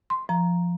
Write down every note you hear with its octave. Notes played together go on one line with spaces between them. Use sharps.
C6
F3 A#5